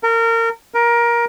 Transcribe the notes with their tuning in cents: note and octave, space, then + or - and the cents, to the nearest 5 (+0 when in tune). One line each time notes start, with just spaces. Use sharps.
A#4 -25
A#4 +20